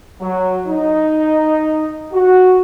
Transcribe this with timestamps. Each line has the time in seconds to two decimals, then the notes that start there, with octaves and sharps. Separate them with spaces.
0.21 F#3
0.67 D#4
2.13 F#4